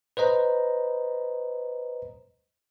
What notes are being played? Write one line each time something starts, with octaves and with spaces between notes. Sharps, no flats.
B4 C5 D#5 A#5